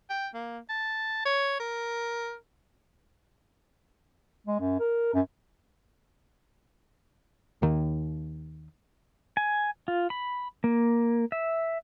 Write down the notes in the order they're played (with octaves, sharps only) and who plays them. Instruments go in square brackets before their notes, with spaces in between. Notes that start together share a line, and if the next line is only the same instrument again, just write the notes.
[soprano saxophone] G5
A#3
A5
C#5
A#4
[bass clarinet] G#3
F#2
A#4
F#2
[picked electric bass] D#2 D#3
[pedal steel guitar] G#5
F4
B5
A#3
E5